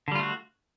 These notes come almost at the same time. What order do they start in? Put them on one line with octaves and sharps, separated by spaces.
D3 G3 F4 A3 F#4